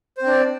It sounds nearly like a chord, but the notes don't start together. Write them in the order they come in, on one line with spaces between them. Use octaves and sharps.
C5 C4 D4 D5